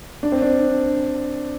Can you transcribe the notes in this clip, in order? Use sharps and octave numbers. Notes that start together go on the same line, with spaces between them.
D4
C4
D4